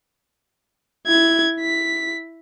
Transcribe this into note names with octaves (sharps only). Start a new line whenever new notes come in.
E4 G#6
E4 B6